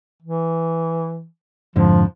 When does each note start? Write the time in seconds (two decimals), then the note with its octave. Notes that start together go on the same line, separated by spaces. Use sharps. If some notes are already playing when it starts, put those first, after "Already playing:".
0.22 E3
1.76 F2 G#2 D3 F3